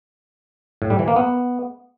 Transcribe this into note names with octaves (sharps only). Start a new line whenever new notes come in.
A2
G3
E3
A#3
B3